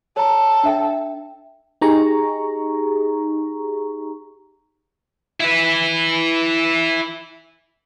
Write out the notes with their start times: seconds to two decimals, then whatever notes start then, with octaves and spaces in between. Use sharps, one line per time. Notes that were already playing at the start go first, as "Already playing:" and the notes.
0.17 A4 C#5 A#5
0.63 D4 E5 G5
1.81 D#4 G4 G#4 A#5 C#6
5.40 E4 B4